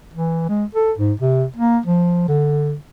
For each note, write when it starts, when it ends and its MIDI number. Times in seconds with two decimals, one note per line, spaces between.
0.14 0.45 52
0.49 0.65 56
0.75 0.92 69
0.98 1.13 44
1.20 1.45 48
1.56 1.79 58
1.86 2.24 53
2.28 2.75 50